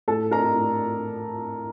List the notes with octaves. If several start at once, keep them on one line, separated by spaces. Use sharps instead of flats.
A2 A4 A5
A#4 A#5
A2